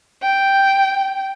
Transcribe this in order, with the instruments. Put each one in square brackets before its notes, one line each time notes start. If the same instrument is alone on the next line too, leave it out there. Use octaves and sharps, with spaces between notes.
[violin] G5